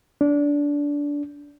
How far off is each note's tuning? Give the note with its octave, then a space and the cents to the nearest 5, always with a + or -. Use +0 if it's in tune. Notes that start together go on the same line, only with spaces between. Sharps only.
D4 -20